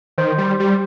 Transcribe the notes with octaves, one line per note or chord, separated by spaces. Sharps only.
D#3 C5
G3
G3